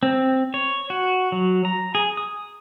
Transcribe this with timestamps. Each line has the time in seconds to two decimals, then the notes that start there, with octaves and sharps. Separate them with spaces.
0.03 C4
0.54 C#5
0.90 F#4
1.32 F#3
1.65 A#5
1.95 G#4
2.17 D#6